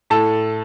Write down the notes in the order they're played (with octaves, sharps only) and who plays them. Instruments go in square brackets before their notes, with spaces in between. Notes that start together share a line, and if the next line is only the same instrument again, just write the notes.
[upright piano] A2 A4 A5